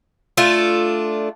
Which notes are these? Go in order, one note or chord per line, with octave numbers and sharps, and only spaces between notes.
A3 D4 F4